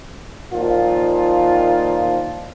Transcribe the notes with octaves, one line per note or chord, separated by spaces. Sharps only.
A#2 D#3 F3 F4